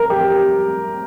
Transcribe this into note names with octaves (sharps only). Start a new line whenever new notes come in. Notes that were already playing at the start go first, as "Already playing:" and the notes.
Already playing: A#4
G4